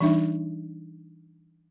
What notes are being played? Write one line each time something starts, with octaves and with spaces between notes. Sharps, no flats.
E3 G3 D4 D#4 E5